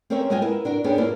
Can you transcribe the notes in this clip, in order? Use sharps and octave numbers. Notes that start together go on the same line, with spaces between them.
C4 C#4 G#4 A#4 C#5 E5
G#3 B3 F4 D#5 G5 G#5
B3 E4 A#4
D4 F#4 A#4
B3 C#4 D4 G4 G#4 A#4
A#3 E4 F4 A4 A#4